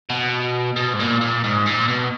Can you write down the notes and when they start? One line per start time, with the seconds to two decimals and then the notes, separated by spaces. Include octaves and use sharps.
0.10 B2
0.76 B2
0.93 G#2
0.99 A#2
1.21 A#2
1.44 G#2
1.67 A#2
1.88 B2